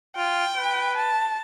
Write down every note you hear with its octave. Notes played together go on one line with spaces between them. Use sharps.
F4 G5
B4
A5